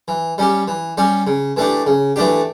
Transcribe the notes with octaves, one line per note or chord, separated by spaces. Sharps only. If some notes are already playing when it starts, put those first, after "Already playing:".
E3
G3 C#4 G4
E3
G3 C#4 G4
C#3
E3 A3 D4 G4
C#3
E3 A3 D4 G4